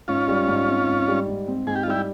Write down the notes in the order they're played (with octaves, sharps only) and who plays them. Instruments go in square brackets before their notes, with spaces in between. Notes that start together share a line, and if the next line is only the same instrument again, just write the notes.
[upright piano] G#2 [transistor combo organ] C#4 F4
[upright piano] G3
G#2
C4
G#2
G3
G#2
C4
[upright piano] G#2 [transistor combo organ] G#4
[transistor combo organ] G4
F4
[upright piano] G3 [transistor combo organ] E4 G4